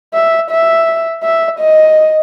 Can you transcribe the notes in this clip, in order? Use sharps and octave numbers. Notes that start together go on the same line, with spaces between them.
E5
E5
E5
D#5